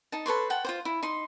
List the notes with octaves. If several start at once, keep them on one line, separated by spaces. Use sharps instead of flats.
D#4 A5
A4 B4 C#5 C6
F#5 G5 A5
F4 F#4 C5
E4
D#4 C6